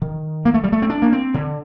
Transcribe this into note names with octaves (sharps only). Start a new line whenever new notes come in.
D#3
A#3
A3
G3
A3
C4
D4
A#3
C4
D3